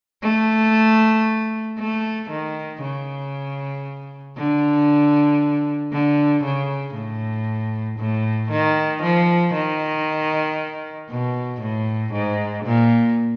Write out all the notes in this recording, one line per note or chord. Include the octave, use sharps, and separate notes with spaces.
A3
A3
D#3
C#3
D3
D3
C#3
A2
A2
D#3
F3
D#3
B2
A2
G#2
A#2